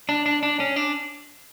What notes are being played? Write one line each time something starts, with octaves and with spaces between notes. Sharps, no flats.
D4
D4
D4
C#4
D4